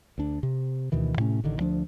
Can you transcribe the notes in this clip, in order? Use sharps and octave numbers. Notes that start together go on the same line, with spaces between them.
D2 D4
C3
D2 B2 D#3 E3
A2 C3 A3 C#4
A1 D3 D#3
D2 F3 D4